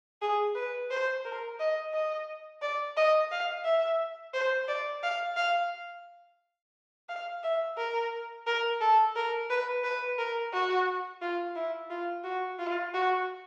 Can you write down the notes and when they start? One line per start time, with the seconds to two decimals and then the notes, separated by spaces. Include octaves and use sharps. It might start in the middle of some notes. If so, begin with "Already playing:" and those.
0.22 G#4
0.55 B4
0.90 C5
1.25 A#4
1.60 D#5
1.93 D#5
2.62 D5
2.97 D#5
3.31 F5
3.65 E5
4.34 C5
4.68 D5
5.03 F5
5.37 F5
7.09 F5
7.43 E5
7.77 A#4
8.47 A#4
8.81 A4
9.16 A#4
9.50 B4
9.84 B4
10.18 A#4
10.53 F#4
11.22 F4
11.56 E4
11.90 F4
12.24 F#4
12.59 F4
12.94 F#4